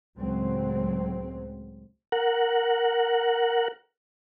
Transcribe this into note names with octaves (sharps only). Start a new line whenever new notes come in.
C#2 A2 F#3 G#3 C4
A#4 F#5